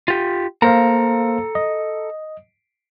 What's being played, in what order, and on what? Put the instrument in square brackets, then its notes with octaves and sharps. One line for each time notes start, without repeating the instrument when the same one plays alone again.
[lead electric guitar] F4 G4
[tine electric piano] A#3 C5 F5 [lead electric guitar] A4 A#5
[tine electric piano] D#5